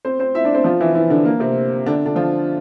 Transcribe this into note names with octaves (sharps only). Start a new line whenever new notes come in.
C4 C5
C4 C5
E4 E5
D4 D5
C4 C5
F3 F4
E3 E4
E3 E4
D3 D4
A#3
C3 C4
D3 D4
D3 D4
F3 F4